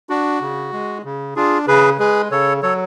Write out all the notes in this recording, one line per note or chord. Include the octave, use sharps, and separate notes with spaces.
D4 F#4
C#3
G#3
C#3
D4 F4 G#4
C#3 G#4 B4
G#3 G#4 B4
C#3 A4 C#5
F#3 A4 C#5